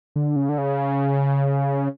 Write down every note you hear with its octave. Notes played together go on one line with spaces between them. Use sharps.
D3
C#3
D3
C#3